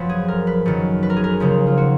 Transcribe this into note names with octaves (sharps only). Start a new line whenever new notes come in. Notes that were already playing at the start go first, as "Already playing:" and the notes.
Already playing: F#2 F3 B4
G#4
A#4
B4
F#2 D#3
B4
A#4
G#4
A#4
D#2 C#3 F3
F4
F#4